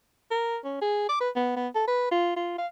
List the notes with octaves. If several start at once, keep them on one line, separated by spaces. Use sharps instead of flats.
A#4
C#4
G#4
D6
B4
B3
B3
A4
B4
F4
F4
F5